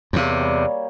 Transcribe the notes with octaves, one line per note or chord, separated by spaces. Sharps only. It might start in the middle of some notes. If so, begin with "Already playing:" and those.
E2 C3 A#3 C#5 D5
G3